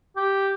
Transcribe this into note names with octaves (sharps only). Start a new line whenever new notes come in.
G4